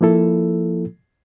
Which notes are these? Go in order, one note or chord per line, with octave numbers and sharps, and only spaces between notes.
F3 A#3 E4 A4